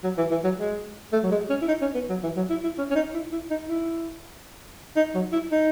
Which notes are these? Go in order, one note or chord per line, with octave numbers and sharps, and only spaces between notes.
F#3
E3
E3
F#3
G#3
A3
F#3
G#3
C#4
E4
D#4
C#4
B3
F#3
E3
F#3
E4
E4
C#4
C#4
D#4
E4
E4
D#4
E4
D#4
F#3
E4
D#4